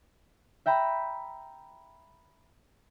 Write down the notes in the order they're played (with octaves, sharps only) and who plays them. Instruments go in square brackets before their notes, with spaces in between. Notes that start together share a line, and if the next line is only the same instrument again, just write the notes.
[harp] E5 G5 A#5 B5